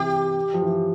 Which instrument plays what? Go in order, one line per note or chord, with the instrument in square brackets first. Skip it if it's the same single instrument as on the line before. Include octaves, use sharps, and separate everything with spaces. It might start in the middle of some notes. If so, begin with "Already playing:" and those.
Already playing: [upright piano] C3 E3 [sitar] G4
[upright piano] F3
E3